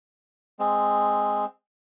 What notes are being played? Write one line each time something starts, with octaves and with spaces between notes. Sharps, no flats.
G#3 C4